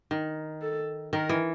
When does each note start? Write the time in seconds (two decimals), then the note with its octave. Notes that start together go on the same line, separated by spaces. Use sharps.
0.11 D#3
0.62 A4
1.13 D#3 A#4
1.29 E3